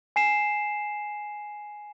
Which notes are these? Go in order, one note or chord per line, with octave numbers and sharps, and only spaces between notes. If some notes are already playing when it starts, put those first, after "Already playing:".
G#5 C7 E7